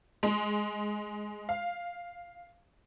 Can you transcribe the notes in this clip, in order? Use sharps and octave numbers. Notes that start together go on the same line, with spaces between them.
G#3
F5